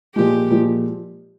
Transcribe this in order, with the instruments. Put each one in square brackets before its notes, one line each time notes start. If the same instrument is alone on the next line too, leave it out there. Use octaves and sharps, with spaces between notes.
[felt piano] A#2 F3 G#3 [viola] G4
[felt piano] A#2 F3 G#3